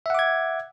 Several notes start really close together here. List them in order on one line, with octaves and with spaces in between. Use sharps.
E5 F#5 D6 G#6